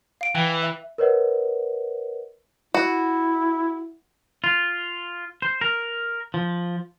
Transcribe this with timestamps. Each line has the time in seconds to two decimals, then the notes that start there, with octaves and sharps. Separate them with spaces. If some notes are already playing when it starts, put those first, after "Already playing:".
0.21 F5 D7
0.35 E3 G5
0.63 E5
0.98 A#4 B4 C#5 D#5 F#5
2.74 E4 F#4
4.44 F4
5.42 C5
5.61 A#4
6.34 F3